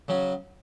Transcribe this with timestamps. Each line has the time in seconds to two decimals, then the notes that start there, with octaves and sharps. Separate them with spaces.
0.08 C#3 F#3 C#4 F#4